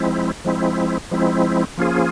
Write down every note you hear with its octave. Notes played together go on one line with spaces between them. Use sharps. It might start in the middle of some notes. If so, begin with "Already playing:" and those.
Already playing: F3 G#3 C4 E4
F3 G#3 C4 E4
F3 G#3 C4 E4
F3 A#3 C#4 F4 G#4